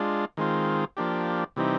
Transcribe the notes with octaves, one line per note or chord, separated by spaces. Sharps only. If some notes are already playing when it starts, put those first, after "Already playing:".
Already playing: G#3 D4 F4
D#3 G#3 C4 F4
F3 A#3 D4 G4
C3 E3 G3 C4 D#4